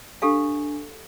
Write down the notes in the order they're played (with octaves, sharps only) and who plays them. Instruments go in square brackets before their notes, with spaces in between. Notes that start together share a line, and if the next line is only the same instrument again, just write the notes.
[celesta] D4 G#5 [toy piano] G4 A4 F5